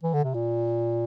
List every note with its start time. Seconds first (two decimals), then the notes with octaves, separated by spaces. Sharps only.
0.03 E3
0.14 D3
0.24 C3
0.34 A#2